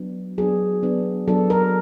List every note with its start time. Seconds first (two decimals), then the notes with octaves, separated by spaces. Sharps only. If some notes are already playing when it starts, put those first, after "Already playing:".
Already playing: F#3 B3 D4
0.38 F#3 B3 D4 G#4
0.83 F#3 B3 D4
1.28 F#3 B3 D4 A4
1.50 A#4